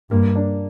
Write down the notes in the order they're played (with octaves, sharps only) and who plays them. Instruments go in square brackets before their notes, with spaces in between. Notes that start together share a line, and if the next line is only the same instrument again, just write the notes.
[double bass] G2 [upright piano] A#3
[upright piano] D4